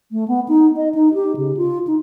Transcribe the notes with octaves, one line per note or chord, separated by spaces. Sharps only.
A3
B3
D#4
D#5
D#4
G4
C#3
F4
D#4